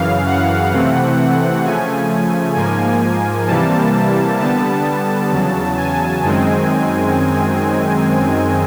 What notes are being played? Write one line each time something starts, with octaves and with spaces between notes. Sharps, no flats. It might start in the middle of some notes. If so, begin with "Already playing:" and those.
Already playing: F#2 C#3 E3 F5
F#5
C3 E3 A3 C4
C#3 F3 A3 G#5
G#2 F3 A#3 G#5
C3 E3 G3 A#3 A5
D3 G3 B3 A5
E2 C#3 F#3
G#5
F#2 D#3 G#3 C4